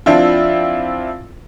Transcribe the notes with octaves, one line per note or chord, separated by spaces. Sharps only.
F3 C4 D4 E4 F4